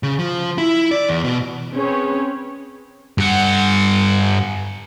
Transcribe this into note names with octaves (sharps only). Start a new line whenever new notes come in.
C#3
F3
E4
D5
E2
B2
C4 C#4 G#4 B4 C#5
G2 F#5